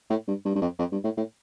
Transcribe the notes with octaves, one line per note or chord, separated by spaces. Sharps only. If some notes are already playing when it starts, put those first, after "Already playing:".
A2
G2
G2
G2
F2
F2
G2
A2
A2